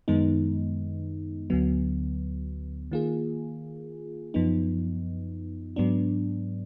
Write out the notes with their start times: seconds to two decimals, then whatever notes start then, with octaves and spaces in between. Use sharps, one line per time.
0.08 F#2 D#3 G#3 B3 D#4
1.50 D2 D3 F#3 B3
2.92 D#3 A#3 F4 G#4
4.34 F#2 F3 B3 D#4
5.76 G#2 F#3 B3 D4